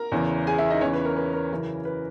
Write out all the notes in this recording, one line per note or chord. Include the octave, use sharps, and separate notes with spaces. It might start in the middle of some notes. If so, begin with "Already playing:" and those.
Already playing: A#4 A#5
E2 C#3 E3
G#4 G#5
E4 E5
D#4 D#5
E2 C#3 E3 C#4 C#5
B4
A#4
B4
A#4
F#2 C#3 E3
B4